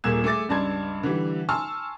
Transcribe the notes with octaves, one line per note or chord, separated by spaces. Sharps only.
D#1 A#2 G#4 E6 G#6 E7
A3 G#4 D6 A6
C#2 G2 D5 A5 C6 G#6
D3 E3 G3
G#5 A5 C6 C#6 E6 F6